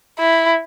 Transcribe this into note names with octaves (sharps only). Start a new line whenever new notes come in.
E4